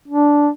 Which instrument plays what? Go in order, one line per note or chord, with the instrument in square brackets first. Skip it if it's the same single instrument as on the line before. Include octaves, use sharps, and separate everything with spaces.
[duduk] D4